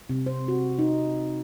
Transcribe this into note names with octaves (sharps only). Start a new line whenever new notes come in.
C3
C5
F#4
D#4